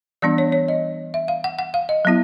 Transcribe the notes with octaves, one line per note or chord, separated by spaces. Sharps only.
E3 G3 B3 D4 D5
C#5
C#5
D#5
E5
F5
F#5
F#5
F5
D#5
F#3 B3 E4